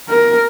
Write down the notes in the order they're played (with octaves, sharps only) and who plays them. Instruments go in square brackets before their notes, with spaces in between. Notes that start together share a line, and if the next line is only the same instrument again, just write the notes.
[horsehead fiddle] A#4